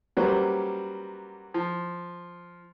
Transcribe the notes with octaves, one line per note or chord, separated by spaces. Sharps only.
F#3 G3 A#3 C#4 B4 C5
F3